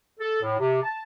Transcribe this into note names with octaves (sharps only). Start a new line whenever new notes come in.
A4
A2
C3
A5